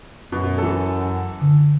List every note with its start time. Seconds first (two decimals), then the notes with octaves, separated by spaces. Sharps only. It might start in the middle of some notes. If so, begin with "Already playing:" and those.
0.32 F#2 B2
0.58 E3 A4
1.41 D3